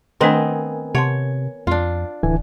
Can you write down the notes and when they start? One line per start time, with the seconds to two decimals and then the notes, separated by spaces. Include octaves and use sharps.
0.21 D#3 A3 B3 C4 D4 A#4 D#5 G#5
0.95 C3 C#5 F#5 A5 C6
1.67 F2 D4 F4
2.23 D1 D3 E3 G#5